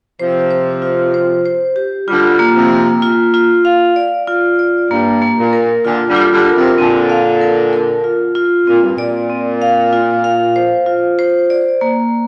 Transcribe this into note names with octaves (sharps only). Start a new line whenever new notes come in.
C3 F3 C5
C5
F4
C5
C5
G4
D3 G3 F4
A#3
C3 F3
A#3
F4
F4
F5
D5
F4
D5
G2 A#3
A#3
A#2
A#4
A#2 D3 F4
D3 G3
F4
D3 G3
A#4
C3 F3
A#2 D3 C4
F5
A#4
A#4
F4
F4
A#2 C4
G2
A#2 D5
C4
F5
F4
F5
C5
F4
C5
D5
A#3